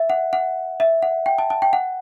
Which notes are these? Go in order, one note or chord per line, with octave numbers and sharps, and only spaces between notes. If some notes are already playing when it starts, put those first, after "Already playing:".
Already playing: E5
F#5
F#5
E5
F#5
G5
A5
A5
G5
F#5